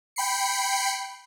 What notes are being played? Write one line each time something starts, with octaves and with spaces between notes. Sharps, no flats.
G5 B5 C7 C#7